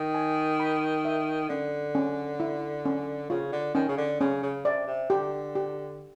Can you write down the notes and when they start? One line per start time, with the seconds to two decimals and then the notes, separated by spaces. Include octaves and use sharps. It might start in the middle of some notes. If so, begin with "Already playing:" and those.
Already playing: D#3
0.15 G#5
0.60 B5
1.05 E5
1.49 D3 C#4
1.95 C#4
2.40 E4
2.85 C#4
3.30 C#3 F4
3.53 D3
3.75 D#3 C#4
3.88 C#3
3.98 D3
4.20 C#3 C#4
4.43 C#3
4.65 C3 D5
4.87 C3
5.10 D3 G4
5.55 G4